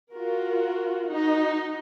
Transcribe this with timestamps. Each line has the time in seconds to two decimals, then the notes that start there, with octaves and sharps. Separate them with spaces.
0.11 F4 F#4 A#4
1.08 D#4 F#4